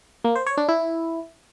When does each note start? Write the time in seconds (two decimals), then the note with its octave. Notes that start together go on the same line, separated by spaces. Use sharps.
0.24 A#3
0.35 C5
0.46 C#5
0.57 D4
0.69 E4